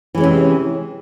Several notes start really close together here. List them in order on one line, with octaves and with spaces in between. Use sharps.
E3 G#3 C#4 C3